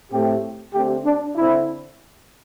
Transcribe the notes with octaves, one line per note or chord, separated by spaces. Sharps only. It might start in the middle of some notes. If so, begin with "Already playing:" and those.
A2 A3 C4 G4
D3 A3 C4 G4
D4
D3 C4 E4